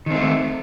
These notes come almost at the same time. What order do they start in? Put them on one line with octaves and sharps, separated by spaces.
D#3 C4 A3